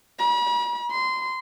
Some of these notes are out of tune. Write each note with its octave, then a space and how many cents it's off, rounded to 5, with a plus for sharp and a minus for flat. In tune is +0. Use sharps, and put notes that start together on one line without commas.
B5 -45
C6 -20